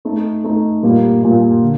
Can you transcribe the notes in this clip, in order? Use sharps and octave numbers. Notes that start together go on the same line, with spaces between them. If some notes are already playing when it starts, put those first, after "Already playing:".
A3 D#4 A4
A3 D#4 A4
A#2 G3 A#3 F4
A#2 G3 A#3 F4
D3